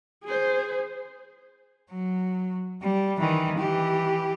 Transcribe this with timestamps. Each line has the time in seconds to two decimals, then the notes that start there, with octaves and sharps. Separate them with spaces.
0.25 G#4 C5
1.91 F#3
2.82 G3
3.19 D#3 E3
3.58 E3 G4